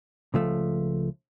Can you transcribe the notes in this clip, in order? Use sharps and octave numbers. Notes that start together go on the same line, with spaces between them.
C#2 F3 A3